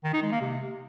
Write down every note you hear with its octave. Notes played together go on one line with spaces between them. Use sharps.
D#3
D#4
G#3
A#3
C3